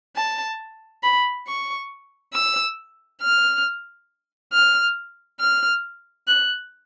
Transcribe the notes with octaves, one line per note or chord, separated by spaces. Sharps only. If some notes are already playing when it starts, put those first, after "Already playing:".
A5
B5
C#6
E6
F6
F6
F6
F#6